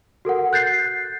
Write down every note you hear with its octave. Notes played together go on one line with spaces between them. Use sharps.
F#4 A4 A#4 F#5
F#6 G6 A6 C7